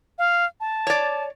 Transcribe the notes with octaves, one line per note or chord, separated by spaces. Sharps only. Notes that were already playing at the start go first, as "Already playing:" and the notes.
F5
A5
C#5 D5